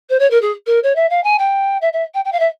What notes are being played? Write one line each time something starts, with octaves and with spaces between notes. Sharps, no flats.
C5
C#5
A#4
G#4
A#4
C#5
E5
F5
G#5
G5
E5
E5
G5
G5
F5
E5